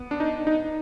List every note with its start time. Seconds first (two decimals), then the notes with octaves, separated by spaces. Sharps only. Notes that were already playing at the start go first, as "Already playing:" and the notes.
Already playing: B3
0.11 D4
0.20 D#4
0.47 D#4